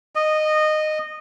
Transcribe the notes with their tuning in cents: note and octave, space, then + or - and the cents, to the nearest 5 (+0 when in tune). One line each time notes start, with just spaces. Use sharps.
D#5 -15